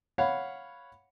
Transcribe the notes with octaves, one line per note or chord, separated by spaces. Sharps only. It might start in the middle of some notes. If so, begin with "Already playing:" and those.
C#5 F5 F#5 B5